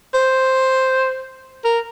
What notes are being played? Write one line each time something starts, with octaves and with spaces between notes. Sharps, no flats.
C5
A#4